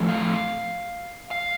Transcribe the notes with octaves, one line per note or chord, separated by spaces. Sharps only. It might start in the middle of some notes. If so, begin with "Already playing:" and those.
Already playing: A2 F3 A3
F5
F5